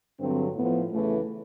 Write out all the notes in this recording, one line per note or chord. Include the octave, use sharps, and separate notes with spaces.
G2 D3 F#3 C4
A2 F3 B3
E2 C#3 E3 A3